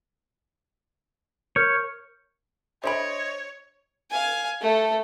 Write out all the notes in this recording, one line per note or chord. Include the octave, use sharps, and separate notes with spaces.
A#4 C#5 F6 G6
D3 C5 C#5 D#5 E5 B5 D7
F5 G#5
A3 A4